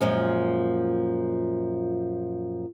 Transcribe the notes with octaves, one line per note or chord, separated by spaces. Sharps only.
F#2 A#2 F3 G#3